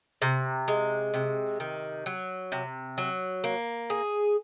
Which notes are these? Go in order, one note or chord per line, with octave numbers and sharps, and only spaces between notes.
C3
G#3
C3
D#3
F#3
C3
F#3
A#3
G#4